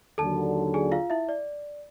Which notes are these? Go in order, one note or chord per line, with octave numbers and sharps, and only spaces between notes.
D#2 D3 F#3 A4 A5
G#4 G#5
F4 F5
E4 E5
D5